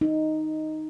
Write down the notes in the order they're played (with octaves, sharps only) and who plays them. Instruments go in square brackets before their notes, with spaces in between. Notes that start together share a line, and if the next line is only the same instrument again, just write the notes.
[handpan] D#4